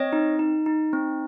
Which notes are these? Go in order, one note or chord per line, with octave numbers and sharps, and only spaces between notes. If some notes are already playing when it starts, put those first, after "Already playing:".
Already playing: C4 C#5 D#5
D#4
D#4
D#4
C4